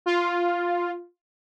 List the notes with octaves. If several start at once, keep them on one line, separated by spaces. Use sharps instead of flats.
F4